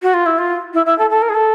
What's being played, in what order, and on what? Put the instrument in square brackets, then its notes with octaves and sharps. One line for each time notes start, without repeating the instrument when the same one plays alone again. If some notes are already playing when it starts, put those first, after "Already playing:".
[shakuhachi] F#4
F4
E4
F4
E4
E4
A4
A4
A#4
G#4
A4